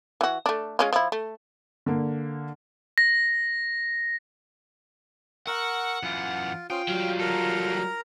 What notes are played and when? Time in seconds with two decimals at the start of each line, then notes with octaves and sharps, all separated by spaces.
0.21 E3 F#4
0.46 A3 D4
0.79 G#3 C#4 F4
0.93 F3 E4
1.12 A3
1.86 D3 A#3
2.98 A#6
5.47 A#4 F#5 C#6 E6
6.03 F#2 E3 F4
6.70 C#4 F4 C5 G5 D#6
6.88 F#3 G3 F5
7.20 F#4 A4 A#4 A#5